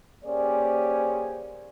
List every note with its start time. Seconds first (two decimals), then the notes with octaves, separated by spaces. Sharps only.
0.25 A#3 C#4 G4 G#4 C5 D5